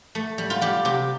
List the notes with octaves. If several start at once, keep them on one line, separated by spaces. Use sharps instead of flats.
A3
G3
F4
G3 G4
C3 G4